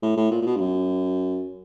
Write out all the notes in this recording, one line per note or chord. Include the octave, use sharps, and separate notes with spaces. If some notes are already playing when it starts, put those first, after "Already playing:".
A2
A2
A#2
A#2
B2
G2
F#2